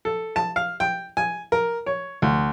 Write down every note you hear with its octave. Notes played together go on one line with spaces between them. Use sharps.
A4
A5
F5
G5
G#5
A#4
C#5
D2